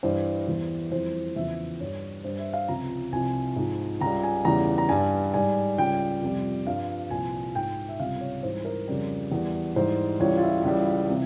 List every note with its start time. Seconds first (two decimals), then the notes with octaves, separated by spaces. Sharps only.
0.03 G2 E3 G3 C5
0.47 E2 E3 G3
0.91 F2 E3 G3 C5
1.36 E2 C#3 F3 E5
1.79 G2 G3 C#5
2.24 G2 G3 C5
2.39 E5
2.53 F5
2.68 C#2 C3 F3 A#5
3.12 C2 C3 F3 G#5
3.56 G#2 F3
4.01 C#2 C#3 G3 A#5
4.23 G#5
4.45 E2 C#3 E3 G3 A#5
4.78 A#5
4.89 G2 G3 G#5
5.34 G#2 G3 G#5
5.78 C#2 C#3 G3 G5
6.21 F2 C3 G3
6.66 G2 F3 F5
7.10 C2 A#2 F3 G#5
7.55 G#2 F3 G5
7.88 E5
8.00 C#2 C3 G3 F5
8.21 C#5
8.43 G#2 E3 G3 C5
8.65 A#4
8.88 F2 C#3 G3
9.32 E2 E3 G3
9.76 G#2 E3 G3 C5
10.20 C#2 C#3 E3 G3 C#5
10.37 F4
10.42 E4
10.64 C#2 C#3 E3 G3
11.09 C3 E3